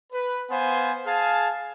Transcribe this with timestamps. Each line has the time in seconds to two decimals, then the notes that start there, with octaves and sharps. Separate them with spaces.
0.13 B4
0.50 B3 C5 F5 G#5 C6
1.06 G#4 F5 G#5 A5